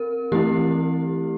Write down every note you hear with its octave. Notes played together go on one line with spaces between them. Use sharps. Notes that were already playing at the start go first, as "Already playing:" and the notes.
Already playing: C4 A#4
E3 A3 C4 E4 G4